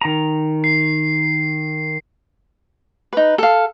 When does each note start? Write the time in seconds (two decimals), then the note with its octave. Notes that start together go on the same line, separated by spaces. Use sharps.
0.01 D#3 A#5
0.64 C7
3.13 D#4 B4
3.38 A4 F5